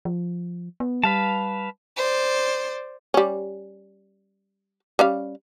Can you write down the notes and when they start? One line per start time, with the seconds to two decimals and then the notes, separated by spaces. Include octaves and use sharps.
0.05 F3
0.80 B3
1.04 G3 B4 F5 A5
1.97 C5 D5
3.14 G3 C#4
4.99 G3 C#4 F5